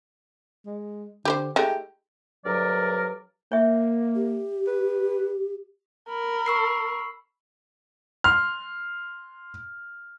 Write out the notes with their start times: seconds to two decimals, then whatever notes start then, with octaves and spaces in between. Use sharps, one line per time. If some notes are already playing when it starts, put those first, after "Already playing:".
0.66 G#3
1.25 D3 G4 B4 C5
1.56 G#3 A3 D#4 G4
2.45 D2 G2 F#3 A#4 D5
3.52 A#3 C#5 E5
4.15 G4
4.67 B4
6.09 A#4 B5
6.46 C#6 E6 C7
8.24 C6 F6